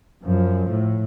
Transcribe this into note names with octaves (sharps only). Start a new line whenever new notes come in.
F#2 F3
A2